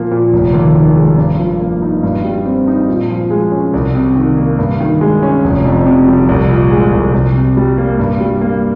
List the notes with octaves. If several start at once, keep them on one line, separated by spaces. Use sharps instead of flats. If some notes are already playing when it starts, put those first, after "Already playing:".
Already playing: A#2 F3 A#3
A#2
F1
D#2
D#3
G#3
G2
F3
A#3
D#4
G2
G3
C4
D#4
A#2
F3
G#3
C#4
C2
C3
D#3
A#3
G2
D#3
G#3
C#4
F1
F2
C3
G3
C2
A#2
G#3
C2
C2
C3
G3
A#3
G2
G3
A#3